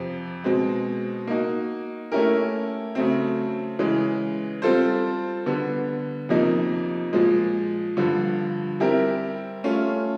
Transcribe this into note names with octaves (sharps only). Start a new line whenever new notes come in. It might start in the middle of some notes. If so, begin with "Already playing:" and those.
Already playing: F2 C3 F3
B2 G#3 C4
A#3 D#4 F#4
A3 C#4 E4 G4 A#4
C#3 F#3 A3 C4
C#3 E3 G#3
G3 C4 F4 A4 C5
D3 G3 B3
F2 C3 F3 A#3 D#4
A#2 F3 G#3
G2 D3 F3
G3 C4 E4 G4 A#4
A3 C#4 F4